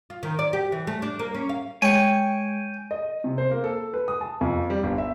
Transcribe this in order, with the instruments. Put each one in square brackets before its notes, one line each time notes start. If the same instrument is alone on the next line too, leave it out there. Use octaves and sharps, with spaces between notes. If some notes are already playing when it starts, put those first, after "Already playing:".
[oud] F4
D#3
D5
G4
E3
A3
D4
A#3
C#4
F5
[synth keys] G#3 [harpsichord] C#5 C#6 [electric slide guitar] G5 G#5
[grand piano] D#5
C3
C5
A#3
A4
B4
D#6
A5
F2
G3
G1
E5